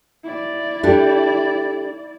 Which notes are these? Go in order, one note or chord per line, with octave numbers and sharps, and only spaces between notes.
E4 D5
D4 G4 A4